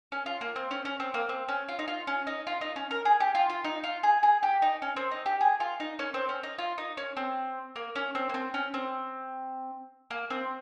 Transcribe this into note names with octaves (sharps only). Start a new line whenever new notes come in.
C#4
F4
A#3
C4
C#4
C#4
C4
A#3
C4
C#4
F4
D#4
F4
C#4
D#4
F4
D#4
C#4
A#4
G#4
G4
F4
F4
D#4
F4
G#4
G#4
G4
D#4
C#4
C4
D#4
G4
G#4
F4
D#4
C#4
C4
C#4
D#4
F4
D#4
C#4
C4
A#3
C#4
C4
A#3
C4
C#4
C4
A#3
C4